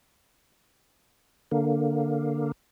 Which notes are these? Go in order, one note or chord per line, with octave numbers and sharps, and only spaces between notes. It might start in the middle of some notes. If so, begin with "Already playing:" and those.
D3 A#3